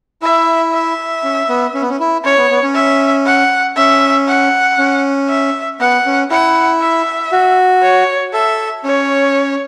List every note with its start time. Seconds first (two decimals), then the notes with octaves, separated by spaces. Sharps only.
0.22 E4 E5
0.73 E5
1.24 C#4
1.49 B3
1.74 C#4
1.82 B3
1.90 C#4
2.00 E4
2.25 C#4 C#5
2.38 B3
2.50 B3
2.63 C#4
2.75 E5
3.26 F#5
3.77 C#4 E5
4.28 F#5
4.79 C#4
5.29 E5
5.80 B3 F#5
6.06 C#4
6.31 E4 F#5
6.82 E5
7.32 F#4
7.83 C#5
8.33 A4 E5
8.84 C#4 C#5